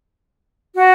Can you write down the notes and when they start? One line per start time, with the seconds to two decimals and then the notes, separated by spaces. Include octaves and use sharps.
0.76 F#4